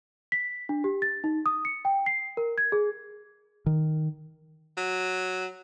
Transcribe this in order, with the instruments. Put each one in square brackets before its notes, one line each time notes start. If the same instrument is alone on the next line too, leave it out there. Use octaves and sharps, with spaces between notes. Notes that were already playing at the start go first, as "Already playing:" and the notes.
[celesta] B6
D4
G4
A6
D#4
D#6
C#7
G5
C7
A#4
G#6
G#4
[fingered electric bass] D#3
[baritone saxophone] F#3